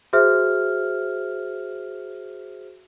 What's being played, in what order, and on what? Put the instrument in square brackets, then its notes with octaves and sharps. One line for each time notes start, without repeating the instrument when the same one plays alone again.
[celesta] F#4 G#4 C5 E5 F6